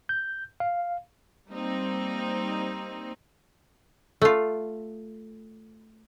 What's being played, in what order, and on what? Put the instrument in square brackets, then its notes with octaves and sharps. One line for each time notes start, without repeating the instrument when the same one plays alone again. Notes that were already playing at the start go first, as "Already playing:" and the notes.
[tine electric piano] G6
F5
[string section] G3 A#3 C4 D#4
[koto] A3 F4